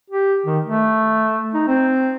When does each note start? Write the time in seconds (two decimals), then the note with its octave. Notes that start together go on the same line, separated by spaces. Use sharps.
0.10 G4
0.46 D#3
0.65 A3
1.54 D#4
1.68 C4